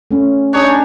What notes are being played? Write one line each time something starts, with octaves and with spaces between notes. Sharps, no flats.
A3 C#4
D4 D#4 G#4 C#5